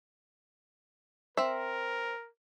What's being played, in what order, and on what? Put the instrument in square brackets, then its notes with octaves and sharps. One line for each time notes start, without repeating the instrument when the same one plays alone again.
[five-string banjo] C4 E5 [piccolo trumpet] A#4